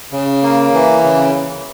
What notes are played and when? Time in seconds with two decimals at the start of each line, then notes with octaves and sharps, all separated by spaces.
0.12 C#3
0.43 A#3
0.73 E3
1.03 C#3